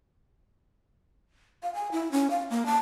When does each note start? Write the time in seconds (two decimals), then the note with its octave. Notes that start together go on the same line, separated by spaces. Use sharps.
1.63 F5
1.75 G#5
1.92 E4
2.12 C#4
2.31 F5
2.50 A#3
2.66 A5